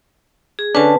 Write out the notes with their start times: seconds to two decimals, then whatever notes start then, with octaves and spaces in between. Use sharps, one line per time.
0.59 G#4
0.75 D3 C#4 D4 B4 A5